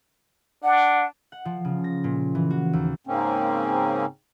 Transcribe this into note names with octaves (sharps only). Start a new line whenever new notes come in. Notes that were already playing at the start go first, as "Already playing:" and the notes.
D4 F#5
F#5
F3
C#3
A#6
A#2
E3
F#4
D#2
G#2 C#3 A#3 C4 C#4